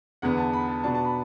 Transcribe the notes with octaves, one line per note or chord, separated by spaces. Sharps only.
E2 D3 B3 F#5
A5
B5
A5
B2 B3 D4 A5
A5
B5